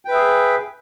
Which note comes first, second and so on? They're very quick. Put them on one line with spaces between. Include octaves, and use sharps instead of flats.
G5 B4 E5 G#4